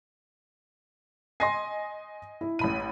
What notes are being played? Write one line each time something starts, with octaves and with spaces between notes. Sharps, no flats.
D#5 G#5 C6 A#6 C7
E4
A1 B5 D#7